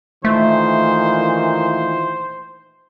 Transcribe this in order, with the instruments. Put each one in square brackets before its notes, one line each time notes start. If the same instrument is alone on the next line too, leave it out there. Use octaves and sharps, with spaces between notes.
[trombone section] A#2 D#3 E3 [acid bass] A3 [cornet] C5